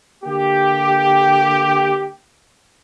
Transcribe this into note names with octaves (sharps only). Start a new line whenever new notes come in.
D3 A#3 G4